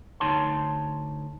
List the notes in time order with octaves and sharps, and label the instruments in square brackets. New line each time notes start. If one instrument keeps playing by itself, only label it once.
[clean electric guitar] D2 D#4 C#5 A5 C6